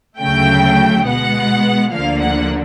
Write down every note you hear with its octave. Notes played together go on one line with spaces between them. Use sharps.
D2 C#3 F#3 A3 G5
B2 G#3 B3 F#5
D2 D3 F3 A#3 F5
F#5